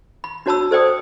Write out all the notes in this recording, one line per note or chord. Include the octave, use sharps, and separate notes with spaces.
B5
D4 F#4 C#5 A5 B5 E6
A4 C5 D5 G5 D#6